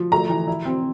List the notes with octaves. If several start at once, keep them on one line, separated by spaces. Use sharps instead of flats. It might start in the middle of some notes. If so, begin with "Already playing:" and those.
Already playing: F3
A3 A#5
E3
E4
C4